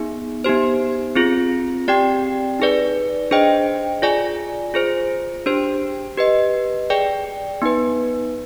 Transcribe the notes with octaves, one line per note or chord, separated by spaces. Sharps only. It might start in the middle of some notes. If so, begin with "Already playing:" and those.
Already playing: B3 D#4 G#4
B3 D#4 G4 C5
C4 F4 G#4
C4 G4 D5 G5
D#4 G#4 B4 D5
D4 G#4 C5 D#5 G5
F4 G#4 D5 G#5
F4 G#4 C5
D4 G4 C5
G4 B4 D#5
G#4 D5 G5
B3 D#4 B4